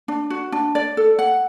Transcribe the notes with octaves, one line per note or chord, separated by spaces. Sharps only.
D4
F#4
D4
D5
A4
F#5